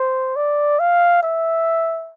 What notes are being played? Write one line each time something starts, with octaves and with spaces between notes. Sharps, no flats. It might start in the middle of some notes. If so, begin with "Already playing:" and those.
Already playing: C5
D5
F5
E5